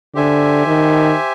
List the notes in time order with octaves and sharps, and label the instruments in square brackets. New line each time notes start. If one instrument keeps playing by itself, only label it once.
[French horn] D3 [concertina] G4 C5 E5 G#5
[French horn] D#3